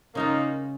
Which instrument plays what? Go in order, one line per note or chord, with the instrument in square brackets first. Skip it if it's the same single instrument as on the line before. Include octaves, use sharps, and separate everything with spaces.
[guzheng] C#3 G#3 F4 [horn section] A#3 D#4